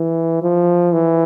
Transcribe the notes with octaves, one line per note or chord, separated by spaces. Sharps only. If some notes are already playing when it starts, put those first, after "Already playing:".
Already playing: E3
F3
E3